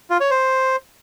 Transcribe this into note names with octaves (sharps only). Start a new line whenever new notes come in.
F4
C#5
C5